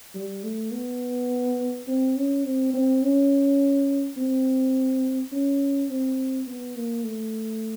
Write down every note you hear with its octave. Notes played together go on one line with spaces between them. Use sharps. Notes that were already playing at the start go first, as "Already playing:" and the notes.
G3
A3
B3
C4
C#4
C4
C4
C#4
C4
C#4
C4
B3
A#3
A3